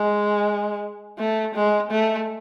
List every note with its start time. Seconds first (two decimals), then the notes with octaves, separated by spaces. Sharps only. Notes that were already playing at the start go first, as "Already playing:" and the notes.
Already playing: G#3
1.19 A3
1.55 G#3
1.91 A3